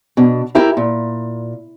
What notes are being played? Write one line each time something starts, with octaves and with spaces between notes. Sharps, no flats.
B2 D4
E4 G4 A#4 E5
A#2